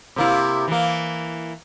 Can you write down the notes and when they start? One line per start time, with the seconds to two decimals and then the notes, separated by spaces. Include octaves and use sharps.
0.16 C3 A#3 E4
0.68 E3 A#3